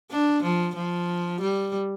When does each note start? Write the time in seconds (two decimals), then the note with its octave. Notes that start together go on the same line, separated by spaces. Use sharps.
0.11 D4
0.43 F3
0.76 F3
1.41 G3